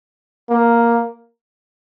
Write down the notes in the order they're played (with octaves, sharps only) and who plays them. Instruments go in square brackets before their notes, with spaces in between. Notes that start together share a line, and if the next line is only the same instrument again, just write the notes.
[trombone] A#3